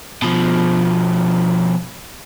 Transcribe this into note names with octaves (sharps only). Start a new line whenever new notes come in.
B2 F3